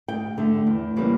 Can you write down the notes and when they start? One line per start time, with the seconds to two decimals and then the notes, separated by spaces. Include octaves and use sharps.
0.08 D2 G5
0.38 D3 A3
0.67 E2
0.96 C#3 E3 G3 A#3